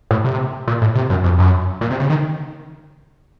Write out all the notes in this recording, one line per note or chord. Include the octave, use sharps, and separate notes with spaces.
A2
C3
A#2
A2
C3
F#2
F2
F#2
A#2
C3
C#3
D#3